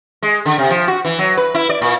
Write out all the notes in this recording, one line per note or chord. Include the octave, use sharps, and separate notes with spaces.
G#3
D3
C3
F3
F#4
E3
F#3
B4
E4
D5
A#2